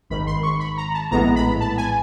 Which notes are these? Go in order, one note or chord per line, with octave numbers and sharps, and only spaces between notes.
G#1 G#2 D#3 B5
C6
C#6
B5
A#5
A5
A#1 A2 E3 G#3 B3 A#5
B5
A5
G#5